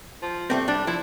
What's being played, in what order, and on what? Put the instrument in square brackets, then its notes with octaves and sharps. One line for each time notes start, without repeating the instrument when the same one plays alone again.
[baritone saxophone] F3
[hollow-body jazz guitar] G3 A3 C4
[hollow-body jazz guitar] G3 [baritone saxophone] D4
[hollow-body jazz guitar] F3 [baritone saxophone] E4